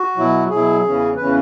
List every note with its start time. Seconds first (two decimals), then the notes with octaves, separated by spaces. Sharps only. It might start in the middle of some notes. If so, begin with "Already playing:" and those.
Already playing: F#4
0.17 B2 F#3 E4
0.50 B2 F#3 E4 G#4
0.83 E2 C#3 E3 C#4
1.16 E2 C#3 E3 C#4 B4